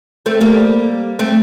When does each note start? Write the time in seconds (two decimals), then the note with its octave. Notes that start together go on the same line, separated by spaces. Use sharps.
0.26 A3 C4
0.41 G3 A#3
1.19 A3 C4